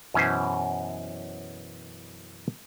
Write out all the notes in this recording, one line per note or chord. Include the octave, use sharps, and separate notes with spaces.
F#2 B2 E3 C#4 B4 C5